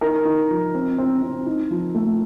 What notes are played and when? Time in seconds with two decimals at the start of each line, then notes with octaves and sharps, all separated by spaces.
0.01 D#4 A#4
0.25 D#4
0.50 F3
0.74 C4
0.98 C4
1.22 C4
1.46 D#4
1.71 F3
1.95 A3